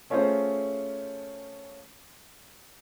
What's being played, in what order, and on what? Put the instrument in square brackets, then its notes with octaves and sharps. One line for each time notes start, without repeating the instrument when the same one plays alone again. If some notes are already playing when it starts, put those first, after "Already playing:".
[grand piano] A3 C#4 F4 G#4 C5